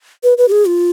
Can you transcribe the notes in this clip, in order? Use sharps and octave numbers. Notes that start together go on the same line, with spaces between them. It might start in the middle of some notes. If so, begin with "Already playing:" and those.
B4
B4
G4
G#4
F4